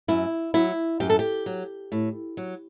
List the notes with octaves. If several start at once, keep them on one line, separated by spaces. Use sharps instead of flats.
F#2 E4
F#3 E4
F#2 G4
A4
G4
F#3
A2
F#3